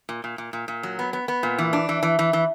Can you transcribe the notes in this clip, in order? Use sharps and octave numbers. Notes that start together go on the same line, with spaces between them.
A#2
A#2
A#2
A#2
A#2
F#3
B3
B3
B3
A#2
E3
D4
E3
E3
E3
E3